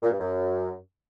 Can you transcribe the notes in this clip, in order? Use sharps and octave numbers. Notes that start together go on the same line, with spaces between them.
A#2
G2
F#2